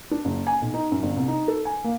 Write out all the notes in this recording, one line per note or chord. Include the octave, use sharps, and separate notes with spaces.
D4
F#1
G#5
B1
D#4
F#2
G1
C2
D#4
A4
G#5
A#3